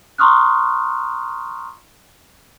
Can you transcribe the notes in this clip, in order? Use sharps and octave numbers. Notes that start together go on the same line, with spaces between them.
A#5 C6 C#6 D#6 F6 F#6